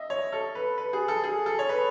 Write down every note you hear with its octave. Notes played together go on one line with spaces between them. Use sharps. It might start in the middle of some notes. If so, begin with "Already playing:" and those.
Already playing: D#5 E5
C#5
A4
B4
B4
G#4
A4
G#4
A4
C#5
B4